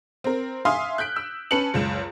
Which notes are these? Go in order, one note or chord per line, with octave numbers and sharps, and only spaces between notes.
C4 A#4
E5 F5 G#5 C6 D#6 F6
F#6 G6 B6 D7
E6
C#4 B4 A5 C#7 F#7
F#1 C#2 E7